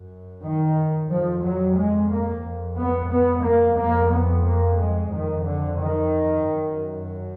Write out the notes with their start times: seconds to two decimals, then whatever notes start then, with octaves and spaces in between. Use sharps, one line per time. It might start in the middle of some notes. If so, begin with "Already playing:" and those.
Already playing: F#2
0.44 D#3
1.10 F2 F3
1.44 F#3
1.77 G#3
2.11 A#3
2.45 F2
2.78 B3
3.12 B3
3.45 A#3
3.79 F2 A#3
4.13 B3
4.46 A#3
4.80 G#3
5.13 F2 D#3
5.47 D3
5.81 D#3
6.48 F#2